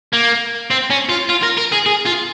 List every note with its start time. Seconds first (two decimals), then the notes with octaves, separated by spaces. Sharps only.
0.13 A#3
0.70 C4
0.90 C#4
1.09 F4
1.29 F4
1.43 A#4
1.58 A#4
1.73 G#4
1.87 G#4
2.06 F4